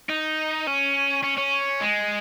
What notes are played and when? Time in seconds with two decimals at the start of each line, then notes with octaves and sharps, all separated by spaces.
0.09 D#4
0.67 C#4
1.23 C#4
1.38 C#4
1.81 G#3